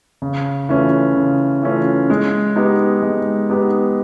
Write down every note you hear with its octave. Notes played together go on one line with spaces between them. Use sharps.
C#3
E3 A3 C#4 F4
C#3
E3 A3 C#4 F4
G#3
B3 D#4 G4
G#3
B3 D#4 G4